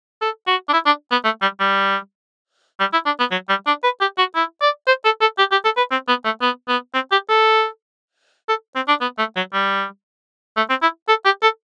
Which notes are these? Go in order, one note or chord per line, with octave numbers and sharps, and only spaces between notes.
A4
F#4
D4
E4
D4
B3
A3
G3
G3
G3
E4
D4
B3
F#3
G3
D4
B4
G4
F#4
E4
D5
C5
A4
A4
G4
G4
A4
B4
C4
B3
A3
B3
B3
C4
G4
A4
A4
C4
D4
B3
A3
F#3
G3
A3
C4
E4
A4
G4
A4